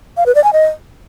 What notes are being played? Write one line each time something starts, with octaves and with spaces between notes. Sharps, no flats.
F5
B4
D5
G#5
D#5